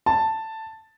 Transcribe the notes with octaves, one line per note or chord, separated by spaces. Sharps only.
A5